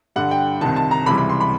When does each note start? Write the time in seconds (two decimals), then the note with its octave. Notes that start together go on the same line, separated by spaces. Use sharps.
0.16 G2 D3 G3 F#5
0.31 G5
0.61 C2 C3 D#3 A5
0.76 A5
0.91 A#5
1.06 C#2 C3 E3 G3 B5
1.18 B5
1.29 C6
1.40 B5